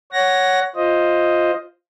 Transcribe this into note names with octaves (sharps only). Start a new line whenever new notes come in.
C#5 F#5 A#6
F4 C5 D#5